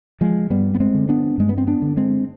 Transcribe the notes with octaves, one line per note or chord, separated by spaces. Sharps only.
F3 G#3
G2 G3 B3
B3
G#3 C4
D3
B3 D4
G2 G#3
B3
C4
B3 D4
D3
G#3 C4